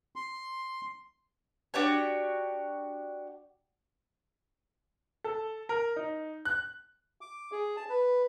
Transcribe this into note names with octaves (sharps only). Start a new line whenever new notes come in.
C6
D4 F#4 G4 C#5
A4
A#4
D#4
F#6
D6
G#4
A5
B4